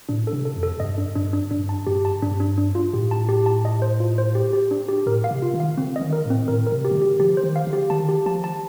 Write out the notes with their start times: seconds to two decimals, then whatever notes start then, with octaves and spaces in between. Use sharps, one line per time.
0.09 A2 D4
0.27 A4
0.33 C3
0.45 A4
0.57 F2
0.63 A4
0.80 G2 D#5
0.98 D4
1.15 G2 D4
1.33 D4
1.51 G2 D4
1.69 A5
1.87 G2 G4
2.05 A5
2.22 G2 D4
2.40 D4
2.58 D4
2.75 F4
2.93 A2 G4
3.11 A5
3.29 G4
3.46 A5
3.65 D#5
3.82 C5
4.00 F4
4.18 C5
4.35 G4
4.53 G4
4.71 D4
4.89 G4
5.06 A2 A#4
5.24 F5
5.31 C3
5.42 F4
5.54 D#3
5.60 F5
5.77 D3 C4
5.96 D#5
6.01 D#3
6.13 A#4
6.25 A2
6.30 C4
6.48 A2 A#4
6.67 A#4
6.72 C3
6.85 G4
6.91 D#3
6.95 D3
7.02 G4
7.19 F3 G4
7.37 C5
7.43 D#3
7.56 F5
7.67 D3
7.73 G4
7.90 D#3 A5
8.09 G4
8.26 F3 A5
8.44 A5